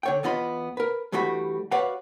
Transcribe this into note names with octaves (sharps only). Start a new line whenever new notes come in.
D3 C#5 G5
E2 B3 F4 D#5 B5
A#4 B4
G2 E3 G3 A3 F#4 B5
F#4 B4 C#5 D5 F5 F#5